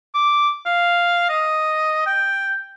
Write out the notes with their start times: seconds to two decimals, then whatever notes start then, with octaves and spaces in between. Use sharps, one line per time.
0.14 D6
0.66 F5
1.29 D#5
2.07 G5